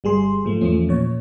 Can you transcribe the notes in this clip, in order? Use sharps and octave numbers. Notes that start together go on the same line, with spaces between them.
G1 G3 G#4 C6
G#2 F3 A3
E2 F3 A3 C#4
A#2 C#5